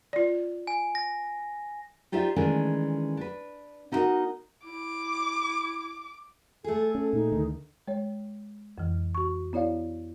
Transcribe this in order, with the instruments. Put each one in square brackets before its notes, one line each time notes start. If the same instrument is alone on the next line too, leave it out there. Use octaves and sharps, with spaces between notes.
[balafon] F4 D5
[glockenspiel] G#5
A#6
[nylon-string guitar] D#4 F4 G4 C5 D5 E5
D#3 E3 G#3 A3 C#4 D4
D4 B4
B3 D#4 E4 F#4 A#4 D#5
[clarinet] E4 [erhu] D6
[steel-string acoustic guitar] A3 G#4 [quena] A4
[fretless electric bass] C#4
[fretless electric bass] A#2 [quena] D#4
[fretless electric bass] D2 D3 D#3
[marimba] G#3 C#5
F2 E3
F#4 C#6
B3 E4 C#5 D5 F5